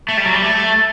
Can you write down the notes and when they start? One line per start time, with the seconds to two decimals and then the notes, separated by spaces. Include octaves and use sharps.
0.09 A3
0.17 G3
0.26 F#3
0.34 G3
0.42 A3